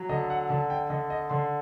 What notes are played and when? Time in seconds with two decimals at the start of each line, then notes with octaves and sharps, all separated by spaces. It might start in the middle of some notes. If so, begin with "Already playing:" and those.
Already playing: F#3
0.09 D3 D#5
0.30 F#5
0.49 D3 A5
0.70 G5
0.90 D3 D#5
1.10 D#5
1.30 D3 C6